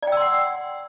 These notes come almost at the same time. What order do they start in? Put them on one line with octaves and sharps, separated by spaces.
D5 G5 E6 C6 F#5